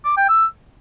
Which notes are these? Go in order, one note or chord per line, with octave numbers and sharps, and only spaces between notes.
D6
G5
E6